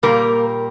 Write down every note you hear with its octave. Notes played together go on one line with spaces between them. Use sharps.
A#2 G3 A#3 A#4